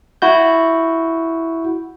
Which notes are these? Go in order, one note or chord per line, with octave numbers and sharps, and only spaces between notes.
E4 F#4 G6